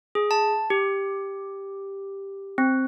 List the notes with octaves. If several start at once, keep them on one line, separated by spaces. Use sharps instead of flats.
G#4
A5
G4
C4